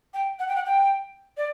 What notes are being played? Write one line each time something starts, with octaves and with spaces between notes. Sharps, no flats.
G5
F#5
G5
F#5
G5
D5